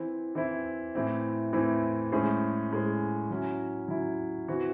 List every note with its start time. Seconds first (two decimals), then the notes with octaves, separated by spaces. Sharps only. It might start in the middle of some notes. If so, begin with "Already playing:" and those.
Already playing: E3 C4 E4
0.35 E3 C4 E4
0.95 A2 E3 C4
1.53 A2 E3 C4
2.12 A2 G#3 C#4 G#4 C5
2.71 A2 G#3 C#4 G#4 C5
3.30 F#3 C#4 E4
3.88 F#3 C#4 E4
4.48 E3 C4 F#4